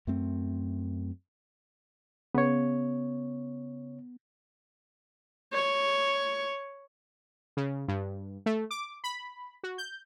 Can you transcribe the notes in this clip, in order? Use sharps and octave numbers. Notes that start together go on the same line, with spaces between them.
F#2 A3 C4
C#3 B3 C#5
C#5
C#3
G2
A3
D6
B5
F#4
G6